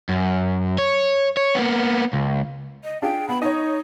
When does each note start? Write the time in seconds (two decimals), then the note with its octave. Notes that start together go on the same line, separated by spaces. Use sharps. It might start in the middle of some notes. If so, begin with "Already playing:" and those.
0.09 F#2
0.78 C#5
1.37 C#5
1.55 A#3 B3
2.13 C#2
2.84 D#5
3.02 D4 F4 G#4 G5
3.29 B3 B5
3.42 D#4 C#5 D#5